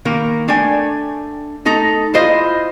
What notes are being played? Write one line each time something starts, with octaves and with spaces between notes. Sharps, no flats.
D#3 A#3 A#4
A3 D4 G5 G#5
A3 D#4 A4 A#5
E4 F4 C5 D#5